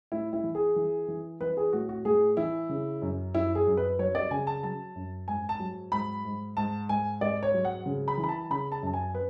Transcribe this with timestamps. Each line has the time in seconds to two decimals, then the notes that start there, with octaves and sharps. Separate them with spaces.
0.12 A2 E4
0.33 E4
0.44 E3
0.55 G#4
0.76 E3
1.08 E3
1.41 E3 B4
1.57 G#4
1.73 A2 F#4
1.89 F#4
2.05 A2 G#4
2.37 E3 E4
2.69 C#3
3.02 F#2
3.34 F#2 E4
3.55 G#4
3.67 F#2
3.77 B4
3.99 F#3 C#5
4.15 D5
4.31 C#3 G#5
4.47 A5
4.63 F#3 A5
4.95 F#2
5.28 G#2 G#5
5.49 A5
5.60 F#3
5.92 G#2 B5
6.25 G#2
6.57 G#2 A5
6.89 G#2 G#5
7.21 G#2 D5
7.43 C#5
7.54 F#3
7.65 F#5
7.86 C#3
8.08 B5
8.18 E3
8.24 B5
8.29 A5
8.50 C#3 B5
8.72 A5
8.83 F#2 A5
8.93 G#5
9.15 B4